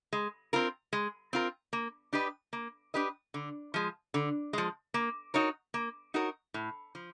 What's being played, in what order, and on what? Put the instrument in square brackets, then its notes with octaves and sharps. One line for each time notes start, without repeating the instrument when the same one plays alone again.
[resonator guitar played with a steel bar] G#3
C4 F4 A#4
G#3
C4 F4 A#4
A#3
D4 G4 B4 D#5
A#3
D4 G4 B4 D#5
D3
F3 G#3
D3
F3 G#3
A#3
D#4 F#4 A#4 C#5
A#3
D#4 F#4 A#4 C#5
A2
F3